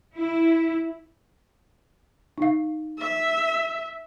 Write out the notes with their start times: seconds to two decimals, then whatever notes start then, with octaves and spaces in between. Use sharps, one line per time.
0.16 E4
2.38 D#4 F5
2.98 E5